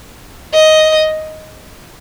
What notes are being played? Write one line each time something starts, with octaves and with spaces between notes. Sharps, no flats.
D#5